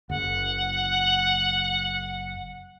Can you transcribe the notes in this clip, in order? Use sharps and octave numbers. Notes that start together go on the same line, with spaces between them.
F#1 F#5